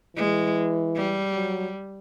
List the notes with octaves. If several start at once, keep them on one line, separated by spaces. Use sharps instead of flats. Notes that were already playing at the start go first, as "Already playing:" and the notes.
E3 G#3
G3
F#3